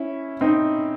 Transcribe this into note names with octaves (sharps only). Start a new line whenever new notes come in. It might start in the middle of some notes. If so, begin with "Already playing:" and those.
Already playing: C#4 E4
C4 D#4